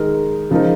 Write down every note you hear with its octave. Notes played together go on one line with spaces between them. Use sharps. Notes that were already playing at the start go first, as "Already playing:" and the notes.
Already playing: D#3 G#3 D#4 A#4
C#3 F3 G#3 D#4 A#4